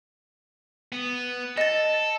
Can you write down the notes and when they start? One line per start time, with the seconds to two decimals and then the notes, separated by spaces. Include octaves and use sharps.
0.92 B3
1.58 A4 D#5 A6